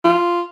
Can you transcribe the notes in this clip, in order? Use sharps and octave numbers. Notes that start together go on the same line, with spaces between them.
F4